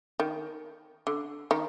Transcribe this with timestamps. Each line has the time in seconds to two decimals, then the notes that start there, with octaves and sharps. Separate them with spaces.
0.20 D#3
1.07 D3
1.51 D#3